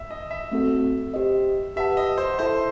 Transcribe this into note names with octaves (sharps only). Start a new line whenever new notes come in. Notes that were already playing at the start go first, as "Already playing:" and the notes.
Already playing: E5
D#5
E5
A3 C4 F#4 A4
G4 C5 D#5
G4 B4 E5 F#5 A5
D#5
C5
E4 A4 C5 E5 A5